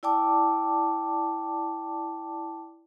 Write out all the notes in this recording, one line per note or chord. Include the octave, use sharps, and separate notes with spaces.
E4 D5 G5 A5 D6